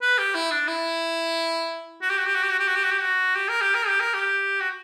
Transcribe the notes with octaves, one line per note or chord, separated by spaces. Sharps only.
B4
G4
E4
D4
E4
F#4
G4
F#4
G4
F#4
G4
F#4
G4
F#4
G4
F#4
G4
F#4
G4
A#4
G4
A#4
G4
A#4
G4
F#4